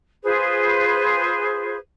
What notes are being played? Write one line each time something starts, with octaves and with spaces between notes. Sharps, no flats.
F4 G#4 B4 C5